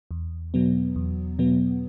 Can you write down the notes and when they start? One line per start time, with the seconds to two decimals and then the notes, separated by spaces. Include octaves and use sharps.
0.11 E2
0.54 B2 F#3 B3
0.96 E2
1.39 B2 F#3 B3